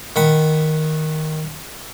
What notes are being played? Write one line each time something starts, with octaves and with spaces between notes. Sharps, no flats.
D#3 F#5 B5